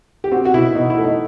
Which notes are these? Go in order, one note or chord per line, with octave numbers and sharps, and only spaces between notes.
G4
C4 F#4
F#4
B2 E4
B2 D#4
E4
A3
D#4